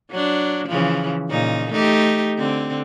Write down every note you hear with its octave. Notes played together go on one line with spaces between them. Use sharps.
F#3 D4
C#3 E3 F3
A#2 C#3 D#4
A3 D#4 G4
D3 C4